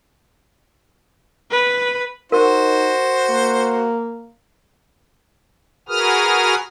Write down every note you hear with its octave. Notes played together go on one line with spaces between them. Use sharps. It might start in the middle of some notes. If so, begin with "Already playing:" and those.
B4
D#4 F#4 A#4 C5
A#3
F#4 G#4 A#4 B4 D#6 F6